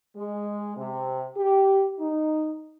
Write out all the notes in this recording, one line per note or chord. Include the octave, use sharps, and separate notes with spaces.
G#3
C3
G4
D#4